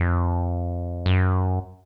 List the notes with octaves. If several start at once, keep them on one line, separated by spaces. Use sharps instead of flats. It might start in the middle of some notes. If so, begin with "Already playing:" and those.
Already playing: F2
F#2